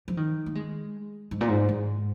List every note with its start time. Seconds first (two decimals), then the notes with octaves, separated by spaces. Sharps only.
0.08 F3
0.17 D#3
0.46 A#3
0.55 G#3
1.31 G#2
1.41 A#2
1.48 G#2
1.69 G#2